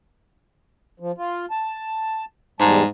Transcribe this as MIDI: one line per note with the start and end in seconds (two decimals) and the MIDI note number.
1.00 1.12 53
1.18 1.46 65
1.51 2.25 81
2.60 2.83 40
2.60 2.87 44
2.60 2.83 55
2.60 2.83 81